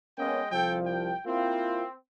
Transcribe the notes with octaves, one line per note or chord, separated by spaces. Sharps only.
G#3 A#3 B3 C#4 D#5 G5
C2 F3 A4 G5
G5
A#3 C4 E4 F4